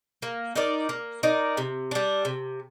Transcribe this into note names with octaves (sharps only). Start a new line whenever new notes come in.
A#3
D#4 A#4 D5
A#3
D#4 A#4 D5
C3
G3 D4
C3